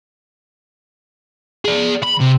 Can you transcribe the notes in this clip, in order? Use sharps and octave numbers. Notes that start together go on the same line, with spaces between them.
G#4 D5
B5
C3